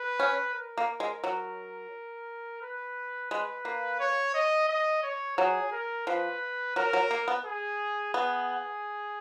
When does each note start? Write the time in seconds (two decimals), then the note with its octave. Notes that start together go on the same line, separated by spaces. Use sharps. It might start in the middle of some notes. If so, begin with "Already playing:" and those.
Already playing: B4
0.20 C#4
0.54 A#4
0.78 A#3
1.00 G#3
1.24 F#3
2.62 B4
3.31 G#3 B4
3.65 A#3
4.00 C#5
4.34 D#5
4.69 D#5
5.03 C#5
5.38 F#3 G#4
5.72 A#4
6.07 F3 B4
6.76 F#3 A#4
6.93 F#3
7.11 A#3
7.28 B3
7.45 G#4
8.14 B3 G#4